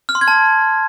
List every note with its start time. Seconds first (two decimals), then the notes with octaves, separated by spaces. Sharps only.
0.09 F6
0.15 C6
0.21 G#6
0.28 A5